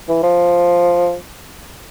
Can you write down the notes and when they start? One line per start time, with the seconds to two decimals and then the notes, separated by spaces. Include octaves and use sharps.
0.08 E3
0.23 F3